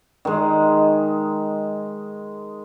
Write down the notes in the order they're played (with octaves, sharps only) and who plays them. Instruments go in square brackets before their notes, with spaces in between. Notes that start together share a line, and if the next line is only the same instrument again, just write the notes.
[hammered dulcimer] D#3 G#3